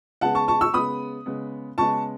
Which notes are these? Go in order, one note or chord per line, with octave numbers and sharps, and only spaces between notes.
C#3 G#3 B3 F#5 A5
A5 C#6
A5 C#6
C#6 E6
C#3 G#3 B3 B5 D#6
C#3 G#3 B3
C#3 G#3 B3 A5 C#6